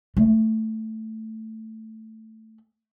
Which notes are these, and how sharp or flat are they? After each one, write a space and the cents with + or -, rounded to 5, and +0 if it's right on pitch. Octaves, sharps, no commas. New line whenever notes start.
A3 +5